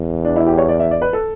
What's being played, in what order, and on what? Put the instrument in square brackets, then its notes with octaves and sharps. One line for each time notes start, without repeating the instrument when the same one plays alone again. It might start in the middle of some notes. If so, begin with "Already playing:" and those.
Already playing: [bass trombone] E2
[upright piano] D4
E4
G4
C#5
D5
E5
D5
B4
A4